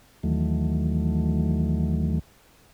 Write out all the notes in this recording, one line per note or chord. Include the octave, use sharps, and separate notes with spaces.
D#2 D#3 E3 F#3 A3